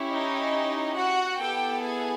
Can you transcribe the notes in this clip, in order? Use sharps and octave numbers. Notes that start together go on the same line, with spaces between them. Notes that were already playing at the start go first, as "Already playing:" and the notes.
Already playing: C#4 E4 G4
D#4 D#5
F#4 F#5
B3 E4 G4 A4 G5
G#4 G#5